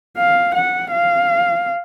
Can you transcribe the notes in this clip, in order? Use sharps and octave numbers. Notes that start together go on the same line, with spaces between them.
F5
F#5
F5